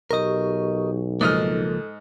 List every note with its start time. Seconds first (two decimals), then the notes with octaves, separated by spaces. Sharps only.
0.11 B1 G4 A#4 D#5 C#6
1.21 C#2 G#2 F3 A#3 A4 D#5 F6